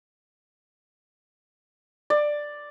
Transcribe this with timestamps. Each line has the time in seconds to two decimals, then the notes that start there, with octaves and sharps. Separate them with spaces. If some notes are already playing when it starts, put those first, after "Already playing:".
2.10 D5